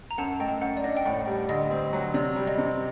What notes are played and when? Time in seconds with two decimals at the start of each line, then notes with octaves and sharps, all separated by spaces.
0.11 A#5
0.18 F#2 F#5 A5
0.40 A3 D#5 G5
0.61 F#2 F#5
0.77 D5
0.84 D4 D#5
0.97 G5
1.05 A2 F#5
1.27 G3
1.49 D2 D#5
1.71 C4
1.93 F#3
2.14 C3 D5
2.36 G3
2.47 D#5
2.58 C3